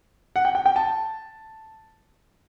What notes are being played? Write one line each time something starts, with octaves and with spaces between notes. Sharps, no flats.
F#5
G5
G5
G5
A5